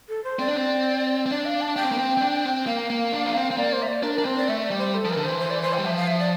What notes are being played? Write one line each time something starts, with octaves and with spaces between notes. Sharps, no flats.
A4
C5
C4 D5
D4
C4
C4
D4 D5
F5
A5
D4 G5
C4
A#3
C4
C4
D4
C4
A#3 F5
A#3
D4
A#3
C4
C4
A#3 D5
C5
E5
D5
D4 A#4
D4 A#4
C4 C5
D5
A3 E5
D5
G3
C5
A4
F3
E3 A#4
D3
E3 C5
C5
D5
C5
G5
G3
F3 E5
F5
E5
D5